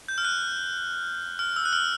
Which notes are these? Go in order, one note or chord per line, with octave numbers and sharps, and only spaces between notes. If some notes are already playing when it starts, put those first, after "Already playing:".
G6
F6
F#6
F6
E6
F#6
F6